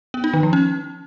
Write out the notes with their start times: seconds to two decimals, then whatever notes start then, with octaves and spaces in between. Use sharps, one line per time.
0.14 B3
0.24 D#4
0.33 D#3
0.43 F3
0.53 C#4